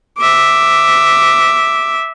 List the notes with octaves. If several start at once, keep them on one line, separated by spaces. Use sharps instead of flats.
E5 D6